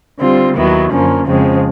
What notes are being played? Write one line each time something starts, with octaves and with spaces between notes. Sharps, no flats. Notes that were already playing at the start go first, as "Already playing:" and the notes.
D3 G3 C4 F4
D#2 D#3 F#3 B3 E4
F#2 D3 F3 A#3 C#4
F2 C#3 F3 G#3 C4